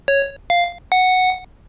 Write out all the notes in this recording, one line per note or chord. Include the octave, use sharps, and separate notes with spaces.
C#5
F5
F#5